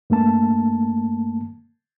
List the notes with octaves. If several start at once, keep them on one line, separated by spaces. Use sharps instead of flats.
G2 A3 A#3 A5